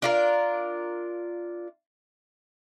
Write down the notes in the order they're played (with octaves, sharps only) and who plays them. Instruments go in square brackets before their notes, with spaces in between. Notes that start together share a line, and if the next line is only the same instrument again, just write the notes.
[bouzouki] D4 F4 A#4